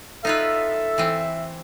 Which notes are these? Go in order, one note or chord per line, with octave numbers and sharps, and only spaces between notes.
D#4 F4 A4 B4 E5
E3 C4